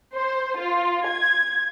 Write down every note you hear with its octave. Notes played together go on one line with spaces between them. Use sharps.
C5
F4
G#6